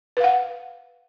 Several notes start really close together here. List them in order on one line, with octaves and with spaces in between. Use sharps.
B4 F5 F#5